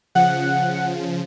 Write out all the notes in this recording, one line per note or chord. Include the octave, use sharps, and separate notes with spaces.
C#3 F3 F#5